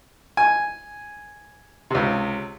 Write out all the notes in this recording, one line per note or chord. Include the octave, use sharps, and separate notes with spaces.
G#5
C#2 C3